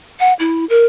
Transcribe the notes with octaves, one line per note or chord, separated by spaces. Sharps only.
F#5
E4
A#4